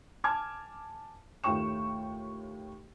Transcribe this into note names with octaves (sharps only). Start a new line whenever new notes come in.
G#5 A5 D6 F6 G#6
D#2 A2 F4 G5 C#6 E7